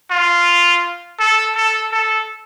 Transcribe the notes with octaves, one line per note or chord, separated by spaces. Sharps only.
F4
A4
A4
A4